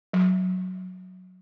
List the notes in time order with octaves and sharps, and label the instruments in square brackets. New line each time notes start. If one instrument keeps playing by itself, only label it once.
[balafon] F#3